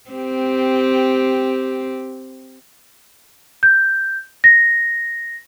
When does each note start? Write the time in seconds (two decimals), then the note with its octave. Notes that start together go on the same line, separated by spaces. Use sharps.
0.11 C4 G4
3.63 G6
4.44 A#6